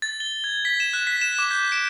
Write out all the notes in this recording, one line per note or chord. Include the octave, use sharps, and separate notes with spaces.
A6
G7
G#6
B6
E7
F#6
B6
E7
D6
G6
D7